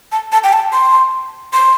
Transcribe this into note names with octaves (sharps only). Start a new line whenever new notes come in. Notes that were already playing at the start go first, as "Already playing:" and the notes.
A5
A5
G5
A5
C6
C6